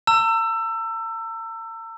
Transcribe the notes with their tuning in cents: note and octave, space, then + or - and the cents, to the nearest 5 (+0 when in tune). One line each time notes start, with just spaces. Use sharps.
A#5 -45 E6 +20